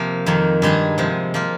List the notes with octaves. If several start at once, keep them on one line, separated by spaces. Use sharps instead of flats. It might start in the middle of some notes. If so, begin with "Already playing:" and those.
Already playing: C3 F3 A#3
F2 D#3 A#3
G2 D#3 G#3 D#4 G#4
C3 F3 G#3
F3 A#3 F4